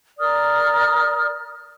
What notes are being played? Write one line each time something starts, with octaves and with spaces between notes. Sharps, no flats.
A#4 D5 D#6 F6